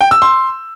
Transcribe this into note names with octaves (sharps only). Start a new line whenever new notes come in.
G5
E6
C6